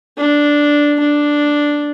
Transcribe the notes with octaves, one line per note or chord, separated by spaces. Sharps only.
D4
D4